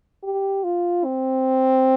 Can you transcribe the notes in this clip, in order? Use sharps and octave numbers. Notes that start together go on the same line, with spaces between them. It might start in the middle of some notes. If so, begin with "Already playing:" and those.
G4
F4
C4